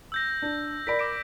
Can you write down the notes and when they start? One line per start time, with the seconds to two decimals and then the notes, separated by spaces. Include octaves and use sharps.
0.12 E6 G6 A#6
0.42 D4
0.87 A#4 D5 B5 B6 D7
0.99 D6 A#6 D7